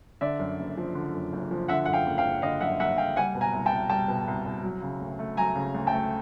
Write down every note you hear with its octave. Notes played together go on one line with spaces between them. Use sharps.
D3 D5 E5
F#2
F#1
F3
D3
F#2
F#1
F3
D3 E5 F#5
F#2 F#5
F5 G5
F#1
F5 G5
F#1
D3 D#5 F5
F#2 E5 F#5
F#1 E5 F#5
F#1 F5 G5
G3 F#5 G#5
B2
G#5 A#5
C2
G5 A5
C2
G3 G5 A5
B2
C2
C2
F#3
C#3
D2
A3
F#3 G#5 A#5
C#3
D2
G5 A5
A3